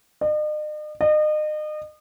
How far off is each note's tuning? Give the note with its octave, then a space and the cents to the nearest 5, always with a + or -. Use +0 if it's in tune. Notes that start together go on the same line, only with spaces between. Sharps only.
D#5 -45
D#5 -35